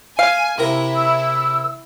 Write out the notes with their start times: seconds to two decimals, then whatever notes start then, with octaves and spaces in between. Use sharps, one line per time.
0.19 F5 G#5
0.58 C3 E4 A#4 A#5
0.96 E6